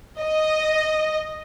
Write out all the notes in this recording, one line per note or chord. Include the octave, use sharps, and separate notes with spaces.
D#5